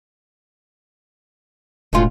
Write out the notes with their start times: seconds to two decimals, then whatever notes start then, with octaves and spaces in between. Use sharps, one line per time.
1.93 E1 A2 C#4 F4